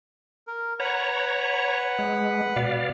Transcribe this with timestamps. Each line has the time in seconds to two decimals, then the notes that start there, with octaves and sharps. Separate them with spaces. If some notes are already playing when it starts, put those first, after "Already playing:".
0.47 A#4
0.80 B4 C#5 F#5 A#5
1.99 G#3
2.56 B2 D5 F5